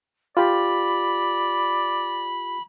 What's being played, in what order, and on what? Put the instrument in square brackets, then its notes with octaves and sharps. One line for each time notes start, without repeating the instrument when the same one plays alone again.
[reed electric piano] F4 G4 [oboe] D5 [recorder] B5